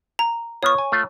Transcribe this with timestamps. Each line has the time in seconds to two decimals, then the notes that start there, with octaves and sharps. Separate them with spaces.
0.19 A#5
0.63 B3 F4 C#5 C#6
0.78 G#5
0.92 A3 F4